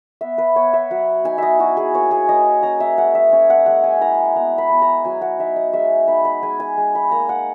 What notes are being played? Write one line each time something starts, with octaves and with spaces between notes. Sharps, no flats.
B3 E5
B4
B3 C#5
E5
F#3 F#5
D#4 G#5
D#5 E5
E4 F#4
G#4
A#3 C#5
G#4
A#3 D#5
C#4 A#5
E5
G#3 F#5
E5
C#4 C#5
F#5
G#3 F#5
G#5
E4 A#5
B3 A#5
B5
B3
A#5
F#3 G#5
F#5
D#4 E5
D#5
G#3 E5
D#4 B5
B5
G#3 G#5
G#5
G#3
B5
A#3 A#5
F#5